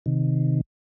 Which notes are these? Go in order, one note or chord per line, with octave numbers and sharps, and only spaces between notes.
C3 D#3